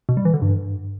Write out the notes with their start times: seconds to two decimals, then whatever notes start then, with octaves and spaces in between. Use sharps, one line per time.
0.09 B2
0.17 G3
0.25 E3
0.34 D3
0.42 G2